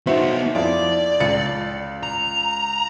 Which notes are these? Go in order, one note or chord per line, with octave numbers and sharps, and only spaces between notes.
B3 D#4 F#4 C5 E5
F2 E4 F4 D5
C#2 A6 C#7
A#5